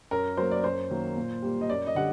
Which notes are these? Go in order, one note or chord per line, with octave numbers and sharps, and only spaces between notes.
F#2 A#4
F#3 A#3 C5
D5
F#2 C5
D#3 F#3 A#3
A#2
G3 A#3
D#5
F#2 D5
D#5
D3 G3 F#5